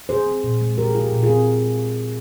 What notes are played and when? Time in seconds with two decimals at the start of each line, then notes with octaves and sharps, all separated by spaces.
0.09 F3 G#4 C5
0.26 C4
0.44 A#2
0.61 G#3
0.78 F3 G4 A#4
0.90 G#4
0.95 F4
1.01 G4
1.13 A#2
1.23 F4 G#4
1.29 C4